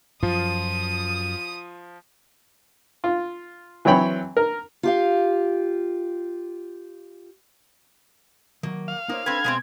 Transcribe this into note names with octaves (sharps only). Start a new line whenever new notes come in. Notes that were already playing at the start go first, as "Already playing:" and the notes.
F#2 F3 F4 D#6
F4
E3 F#3 C4 C#5 G5 B5
A#4
F4 G4 F5
D#3 E3 F#3 A#3
F5
A#3 D#4 C5 C#5
C4 D4 A4 B4 G5 G#6
B2 G#3 B3 C4